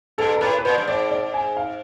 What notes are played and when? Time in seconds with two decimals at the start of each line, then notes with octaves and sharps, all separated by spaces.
0.18 G2 A4
0.36 A#4
0.41 A2 B4
0.59 B4
0.64 A#2 C5
0.78 G2
0.87 G#2 D5
1.11 D5
1.34 G#5
1.57 F5